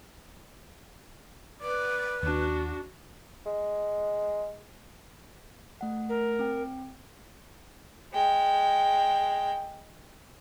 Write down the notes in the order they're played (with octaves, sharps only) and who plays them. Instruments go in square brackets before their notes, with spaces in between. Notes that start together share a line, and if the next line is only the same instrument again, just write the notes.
[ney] B4 [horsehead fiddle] D5
[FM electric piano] D#2 [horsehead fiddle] D4 F#4
[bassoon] G#3
[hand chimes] A3 F#5
[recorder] A#4
[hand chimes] C4 G5
[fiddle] G#3 G5